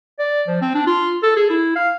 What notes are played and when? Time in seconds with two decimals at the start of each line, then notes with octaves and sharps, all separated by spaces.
0.19 D5
0.48 F3
0.62 C4
0.75 D4
0.87 F4
1.23 A4
1.37 G#4
1.50 E4
1.76 F5